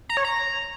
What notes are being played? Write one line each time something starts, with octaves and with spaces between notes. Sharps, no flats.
A#5
C#5
A#5